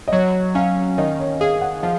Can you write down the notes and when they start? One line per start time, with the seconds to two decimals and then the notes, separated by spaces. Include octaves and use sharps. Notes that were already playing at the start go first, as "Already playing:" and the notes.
0.08 D#5
0.12 F#3 C#5
0.55 C#4 F5
0.98 D#3 D#5
1.19 C#5
1.40 G#4 F5
1.61 F#5
1.83 F3 F5